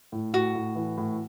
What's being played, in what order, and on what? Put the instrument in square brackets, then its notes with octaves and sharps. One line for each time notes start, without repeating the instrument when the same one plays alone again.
[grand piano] A2
[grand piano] A2 [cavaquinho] F#4
[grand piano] A2
E3
A2